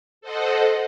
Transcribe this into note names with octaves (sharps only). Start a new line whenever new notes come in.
A4 C5 D#5 F#5